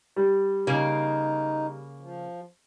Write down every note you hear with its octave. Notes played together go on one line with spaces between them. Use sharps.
G3
C#3 A#3 D#4
F3